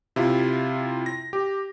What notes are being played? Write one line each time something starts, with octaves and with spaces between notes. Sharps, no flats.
C3 E4 F4
A#6
G4